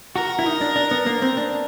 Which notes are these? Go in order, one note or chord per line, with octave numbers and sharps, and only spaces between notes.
F#4 A#4
E4
D#4
D4
D4
B3
A#3
C4
D4